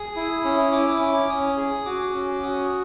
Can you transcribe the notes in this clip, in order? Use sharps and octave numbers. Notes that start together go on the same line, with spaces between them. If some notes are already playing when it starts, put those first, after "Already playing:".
Already playing: G#4 D#6
E4
C#4
E4 D6
C#4 D6
C#4 D#6
G#4
F#4 D6
C#4
F#4 D#6